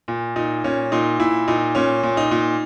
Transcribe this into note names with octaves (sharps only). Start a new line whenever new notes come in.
A#2
A#2 D#4
A#2 C#4
A#2 D#4
A#2 E4
A#2 D#4
A#2 C#4
A#2
D#4
A#2